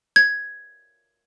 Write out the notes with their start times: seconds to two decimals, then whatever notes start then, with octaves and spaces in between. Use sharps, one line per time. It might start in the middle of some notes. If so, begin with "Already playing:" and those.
0.16 G#6